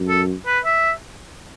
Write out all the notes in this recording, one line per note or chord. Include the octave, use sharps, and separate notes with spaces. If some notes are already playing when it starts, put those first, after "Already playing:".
Already playing: F#2
A4
B4
E5